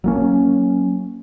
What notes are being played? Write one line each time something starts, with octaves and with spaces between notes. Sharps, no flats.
F#3 A#3 C#4